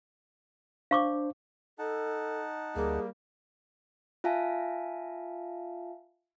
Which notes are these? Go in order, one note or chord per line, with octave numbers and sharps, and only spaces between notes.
D4 C5 F5 C#6 D6
D#4 A4 F#5 A5
D2 G3 A#3 G#4
F4 E5 F5 G#5 A5